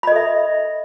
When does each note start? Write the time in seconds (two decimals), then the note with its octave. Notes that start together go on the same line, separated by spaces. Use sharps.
0.03 B5
0.07 D#5
0.12 A4
0.16 E5